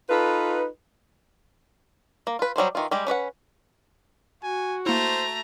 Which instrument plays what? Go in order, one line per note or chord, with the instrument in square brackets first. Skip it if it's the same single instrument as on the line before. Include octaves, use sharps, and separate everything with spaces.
[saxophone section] D#4 F4 A4 B4
[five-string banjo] A#3
F4 B4
F#3 G3 A3 C5
D#3 E3 F4
G3 G#3 G4
C#4 B4 D5 F#5
[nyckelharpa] F#4 [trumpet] G#5
[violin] A3 A#5 [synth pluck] A#3 E4 [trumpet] C5